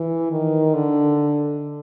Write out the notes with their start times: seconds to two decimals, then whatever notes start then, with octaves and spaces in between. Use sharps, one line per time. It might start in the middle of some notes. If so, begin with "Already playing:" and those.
Already playing: E3
0.32 D#3
0.74 D3